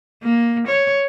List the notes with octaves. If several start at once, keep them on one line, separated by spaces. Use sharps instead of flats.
A#3
C#5